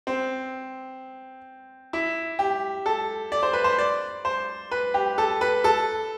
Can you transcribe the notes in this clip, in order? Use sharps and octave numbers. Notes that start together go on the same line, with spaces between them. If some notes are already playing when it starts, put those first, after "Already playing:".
C4
E4
G4
A4
D5
C5
B4
C5
D5
C5
B4
G4
A4
B4
A4